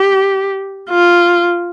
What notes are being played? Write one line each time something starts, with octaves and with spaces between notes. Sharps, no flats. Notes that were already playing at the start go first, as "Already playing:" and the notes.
Already playing: G4
F4